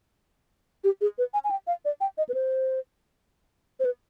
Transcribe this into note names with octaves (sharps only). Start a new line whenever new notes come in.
G4
G#4
B4
G#5
G#5
G5
F5
D5
G5
D#5
B4
C5
C5
B4